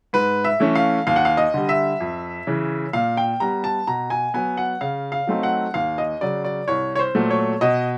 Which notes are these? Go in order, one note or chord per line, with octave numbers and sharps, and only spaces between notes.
G#2 B4
E5
E3 A3 C#4
F5
D#2 F5
F#5
F5
D#5
D3 G3
E5
F2
C#3 E3
A#2 F5
G5
G3 B3 A#5
A5
B2 A#5
G#5
F#3 B3 G#5
F#5
C#3 F5
F5
F#3 A3 C4 D#4
F#5
D#2 F5
D#5
C#3 F#3 D5
D5
C2 C#5
C#5
C5
A#2 F#3 A3
C#5
B2 D#5